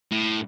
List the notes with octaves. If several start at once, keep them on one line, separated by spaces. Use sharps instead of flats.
A2